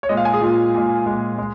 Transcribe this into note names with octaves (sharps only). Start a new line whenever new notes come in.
C#5
A#2 G#3 D#5
F5
G#5
G#4
A#2 G#3 F4
A#2 G#3
A#2 G#3
G#3